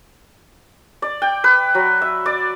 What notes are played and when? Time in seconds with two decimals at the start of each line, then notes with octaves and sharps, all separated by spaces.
1.02 D5
1.22 G5
1.44 B4
1.75 F#3
2.01 E5
2.26 D5